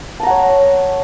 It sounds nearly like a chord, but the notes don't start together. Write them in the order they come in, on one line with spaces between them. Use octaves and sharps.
A5 A#5 F#5 C#5